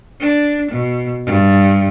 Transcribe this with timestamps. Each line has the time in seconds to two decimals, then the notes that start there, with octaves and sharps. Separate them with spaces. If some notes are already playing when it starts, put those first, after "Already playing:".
0.20 D4
0.70 B2
1.25 G2